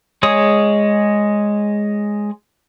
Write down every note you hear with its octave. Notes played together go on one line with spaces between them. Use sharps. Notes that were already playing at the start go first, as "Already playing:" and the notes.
G#3 G#4 C#5 D#6